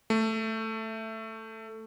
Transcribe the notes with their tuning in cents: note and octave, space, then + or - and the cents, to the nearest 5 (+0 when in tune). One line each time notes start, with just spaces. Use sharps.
A3 +10